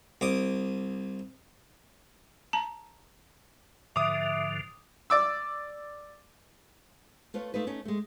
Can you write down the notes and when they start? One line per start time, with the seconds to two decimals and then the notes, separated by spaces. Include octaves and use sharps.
0.21 C2 D6 D#6
2.53 A5 A#5
3.96 G#2 D3 F3 E5 D6 D#6
5.10 D5 D6 E6
7.34 A3 F4 B4 C#5
7.54 A3 D#4 F4 B4
7.67 A3 C#4 D#4
7.85 G#3 A3